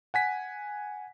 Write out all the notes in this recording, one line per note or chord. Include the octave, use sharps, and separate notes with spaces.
F#5 G#5 B6